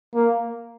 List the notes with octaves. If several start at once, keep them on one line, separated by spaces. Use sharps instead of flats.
A#3